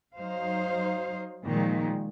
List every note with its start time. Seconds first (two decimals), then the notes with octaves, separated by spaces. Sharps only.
0.17 F#3 D#4 C5 F5
1.45 A#2 D#3 F3 G#3